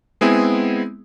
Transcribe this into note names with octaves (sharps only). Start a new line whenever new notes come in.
G#3 B3 C4 E4 G#4